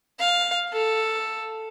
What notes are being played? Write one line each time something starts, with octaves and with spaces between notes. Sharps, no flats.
F5
A4